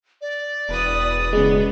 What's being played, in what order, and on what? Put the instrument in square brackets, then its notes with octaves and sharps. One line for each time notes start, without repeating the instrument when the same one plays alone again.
[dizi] D5
[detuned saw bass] E1 [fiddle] B4 D#6
[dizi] D5
[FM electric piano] C#3 G#3 [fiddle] B3